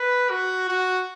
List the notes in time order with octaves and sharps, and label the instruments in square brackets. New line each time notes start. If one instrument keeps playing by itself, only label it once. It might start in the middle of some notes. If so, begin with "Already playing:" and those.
Already playing: [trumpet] B4
F#4
F#4